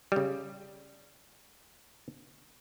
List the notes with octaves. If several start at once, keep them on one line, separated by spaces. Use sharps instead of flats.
C#3 G3